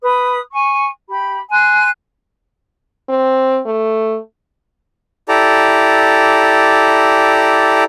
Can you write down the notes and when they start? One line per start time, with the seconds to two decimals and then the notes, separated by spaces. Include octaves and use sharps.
0.03 B4 D#6
0.52 G#5 C#6
1.08 G4 B5
1.51 G#5 C6 F#6
3.09 C4
3.66 A3
5.29 E4 G4 A4 D5 A#5